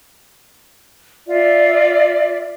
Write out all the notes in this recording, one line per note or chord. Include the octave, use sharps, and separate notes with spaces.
F4 D5 E5